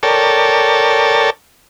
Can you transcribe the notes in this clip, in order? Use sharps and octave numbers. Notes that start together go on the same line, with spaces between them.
A4 A#4 C#5 D5 G5 A5